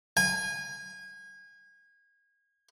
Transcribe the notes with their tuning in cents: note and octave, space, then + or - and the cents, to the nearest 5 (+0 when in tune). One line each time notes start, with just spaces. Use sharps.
G#5 -25